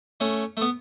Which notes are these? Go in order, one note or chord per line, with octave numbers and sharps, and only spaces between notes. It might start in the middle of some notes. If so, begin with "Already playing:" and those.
A3 C#4
A3
B3